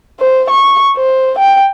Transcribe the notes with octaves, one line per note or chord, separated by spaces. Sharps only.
C5
C#6
C5
G5